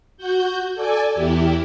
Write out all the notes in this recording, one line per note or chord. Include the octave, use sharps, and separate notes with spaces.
F#4 G6
A4 D5 G#5
E2 E4 G4